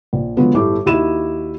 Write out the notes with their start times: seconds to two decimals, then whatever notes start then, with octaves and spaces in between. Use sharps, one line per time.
0.13 A#1
0.37 D3 F3 F#3 G#3 B3
0.54 G1 A2 A3 G4 D6
0.86 D#2 D#4 E4 F#4 D#7 E7